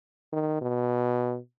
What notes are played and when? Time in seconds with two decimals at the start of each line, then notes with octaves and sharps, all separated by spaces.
0.33 D#3
0.61 B2